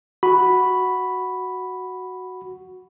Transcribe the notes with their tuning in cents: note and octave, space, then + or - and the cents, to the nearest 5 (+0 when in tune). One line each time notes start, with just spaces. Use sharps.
F#4 +0 B5 +0